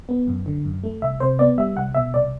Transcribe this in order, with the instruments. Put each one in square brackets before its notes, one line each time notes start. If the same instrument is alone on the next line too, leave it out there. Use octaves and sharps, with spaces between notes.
[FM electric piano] B3
F#2
D3
F#2
A3
C2 E5
C3 C5
B3 D5
G3 E5
C2 F#5
B2 E5
C2 D5